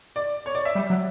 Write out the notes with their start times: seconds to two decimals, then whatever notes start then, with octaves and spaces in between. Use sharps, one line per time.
0.16 D5
0.46 C#5
0.55 D5
0.65 E5
0.75 G3
0.90 F#3